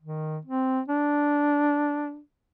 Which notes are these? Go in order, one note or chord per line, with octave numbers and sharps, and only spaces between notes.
D#3
C4
D4